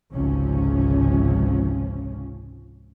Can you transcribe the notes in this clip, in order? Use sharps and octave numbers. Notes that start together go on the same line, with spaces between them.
G#1 C#2 C3 F3 C#4